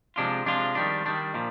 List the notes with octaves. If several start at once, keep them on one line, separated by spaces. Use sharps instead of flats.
C3 F3 G#3 D4 F4
C3 F3 G#3 D4 F4
D#3 G3 D4
D#3 G3 D4
A#2 F3